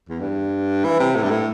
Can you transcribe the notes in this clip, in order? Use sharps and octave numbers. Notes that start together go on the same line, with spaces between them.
E2
G2
E3
C3
A2
G2
A2